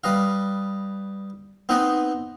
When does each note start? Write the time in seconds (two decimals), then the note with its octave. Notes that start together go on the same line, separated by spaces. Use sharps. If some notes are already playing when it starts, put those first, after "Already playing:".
0.04 G3 B4 D#5 F5
1.69 B3 C4 D#4 B4 D#5